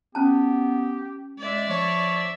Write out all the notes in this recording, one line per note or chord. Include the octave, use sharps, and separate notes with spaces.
B3 C#4 G4 A5
G#3 D5 E5
F3 C#5